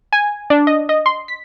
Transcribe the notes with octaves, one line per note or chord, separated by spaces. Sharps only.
G#5
D4
D#5
D#5
C6
B6